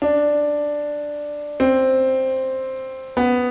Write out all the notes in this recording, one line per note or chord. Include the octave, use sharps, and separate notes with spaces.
D4
C4
B3